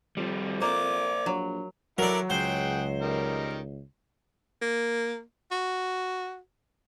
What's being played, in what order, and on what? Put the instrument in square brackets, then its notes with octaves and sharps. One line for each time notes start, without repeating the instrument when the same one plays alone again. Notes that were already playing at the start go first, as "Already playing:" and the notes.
[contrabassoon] F2 [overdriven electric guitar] F3 G3
[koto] A#3 [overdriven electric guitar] C5 D5 [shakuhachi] D6
[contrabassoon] A#1 [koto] F#3
[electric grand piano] F#3 [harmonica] E4 A4 F#5 [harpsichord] A#4 D5
[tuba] C#2 [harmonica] G#4 F#5 G5 [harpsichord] C5
[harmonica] D#3 G3 A#4
[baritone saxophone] A#3
F#4